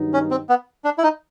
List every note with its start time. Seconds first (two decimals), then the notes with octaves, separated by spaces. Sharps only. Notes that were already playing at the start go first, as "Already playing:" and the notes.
Already playing: G2 D#3 F#3 B3 D#4
0.14 C#4
0.31 C4
0.49 B3
0.84 D4
0.98 E4
1.03 D#4